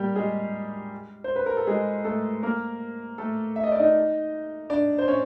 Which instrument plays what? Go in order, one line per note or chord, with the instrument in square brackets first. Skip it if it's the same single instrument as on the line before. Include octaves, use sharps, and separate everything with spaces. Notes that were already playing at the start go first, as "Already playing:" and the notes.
Already playing: [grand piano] G3 A#3 G4
G#3 G#4
C5
B4
A#4
A4
G#3 G#4
A3 A4
A#3 A#4
A3 A4
E5
D#5
D5
D#4 D#5
D4 D5
C5
C#4 C#5